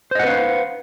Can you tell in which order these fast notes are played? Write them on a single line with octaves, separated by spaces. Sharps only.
C5 D#5 F#5 B4 F5